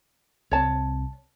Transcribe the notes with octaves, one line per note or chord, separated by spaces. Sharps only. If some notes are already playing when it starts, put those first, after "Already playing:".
C2 C4 C#5 A5